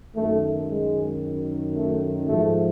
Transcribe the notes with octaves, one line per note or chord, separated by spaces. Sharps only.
F#2 D#3 A3
G#3
A3
G#2 F3 A3